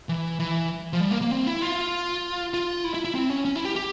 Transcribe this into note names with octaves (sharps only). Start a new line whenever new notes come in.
E3
E3
F3
G3
A#3
A#3
C4
E4
F4
F4
E4
E4
E4
C4
C#4
C#4
E4
G4
G4